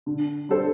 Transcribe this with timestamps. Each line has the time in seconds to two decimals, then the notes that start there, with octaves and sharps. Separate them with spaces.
0.06 D3
0.49 G3 D4 A4 C5